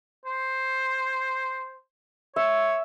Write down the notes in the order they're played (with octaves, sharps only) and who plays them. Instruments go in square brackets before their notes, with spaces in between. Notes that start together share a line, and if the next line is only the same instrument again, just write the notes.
[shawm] C5
[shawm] C#5 [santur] E5